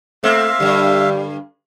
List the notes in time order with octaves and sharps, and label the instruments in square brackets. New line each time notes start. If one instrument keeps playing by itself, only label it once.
[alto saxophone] A3 [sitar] A#3 C4 [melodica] E5 F5
[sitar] G2 D3 [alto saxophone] G3